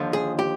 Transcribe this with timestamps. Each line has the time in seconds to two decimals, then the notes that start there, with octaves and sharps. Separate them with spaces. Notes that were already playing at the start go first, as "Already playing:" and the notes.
Already playing: D#2 D3 F3
0.13 G#4
0.39 G4